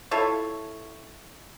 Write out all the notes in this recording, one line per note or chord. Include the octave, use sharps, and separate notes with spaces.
E4 F4 A4 C#5